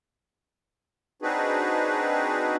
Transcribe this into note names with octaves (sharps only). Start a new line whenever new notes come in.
C4 D4 D#4 F#4 G#4 B4